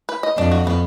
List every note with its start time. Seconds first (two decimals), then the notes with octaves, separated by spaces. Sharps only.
0.09 B4
0.23 D#5
0.38 F2 D4
0.52 F#4
0.67 B3